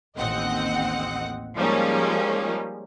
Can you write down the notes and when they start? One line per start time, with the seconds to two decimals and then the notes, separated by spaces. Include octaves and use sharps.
0.18 A1 D#2 C4 D#5 F#5
1.55 F3 G3 G#3 A#3 C#4 D#4